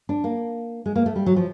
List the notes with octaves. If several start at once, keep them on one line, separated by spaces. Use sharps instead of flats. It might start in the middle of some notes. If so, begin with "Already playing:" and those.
D4
A#3
G#3
A#3
A3
G3
F#3
F3